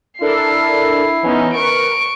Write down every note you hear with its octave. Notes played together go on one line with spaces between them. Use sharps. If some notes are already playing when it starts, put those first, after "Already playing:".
D4 E4 A4 A#4 C7
E3 B3 C#4 D#4
A#4 B4 C#6 D7